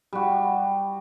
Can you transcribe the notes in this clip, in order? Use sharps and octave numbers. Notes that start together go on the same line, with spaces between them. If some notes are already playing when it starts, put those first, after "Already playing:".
G3 F#4